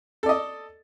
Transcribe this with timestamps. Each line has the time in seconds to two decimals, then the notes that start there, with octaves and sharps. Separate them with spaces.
0.23 A4
0.26 D5
0.29 D#5